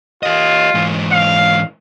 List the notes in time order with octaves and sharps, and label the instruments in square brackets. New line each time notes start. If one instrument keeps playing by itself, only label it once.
[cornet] F4 [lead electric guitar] G4 D#5
[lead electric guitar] G#2 E3
[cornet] F5